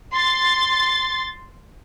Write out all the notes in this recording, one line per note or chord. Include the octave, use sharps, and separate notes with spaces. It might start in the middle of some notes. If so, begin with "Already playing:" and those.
C6 A6